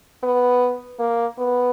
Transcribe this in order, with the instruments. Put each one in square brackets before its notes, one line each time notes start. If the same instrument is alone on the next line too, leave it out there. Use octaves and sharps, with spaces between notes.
[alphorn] B3
A#3
B3